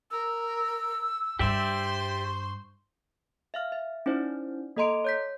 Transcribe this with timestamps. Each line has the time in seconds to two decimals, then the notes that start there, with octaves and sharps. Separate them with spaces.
0.11 A#4 E6
1.39 G2 G4 C5 D5 E5 C6
2.24 C#6
3.54 E5 F5 F6
3.72 E5
4.06 C#4 D#4 E4 C5 D5
4.76 A#3 A4 D#5 A#5 C6 D7
5.05 C#5 G6 B6